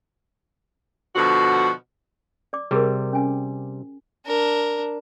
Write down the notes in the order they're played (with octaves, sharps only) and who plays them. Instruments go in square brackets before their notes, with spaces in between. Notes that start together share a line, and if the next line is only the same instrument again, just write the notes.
[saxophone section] B2 D3 F3 F#4
[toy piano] D5 D6
[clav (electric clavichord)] C3 G3 [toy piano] G#4 A#4
[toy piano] C#4 G#5
[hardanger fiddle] D4 A#4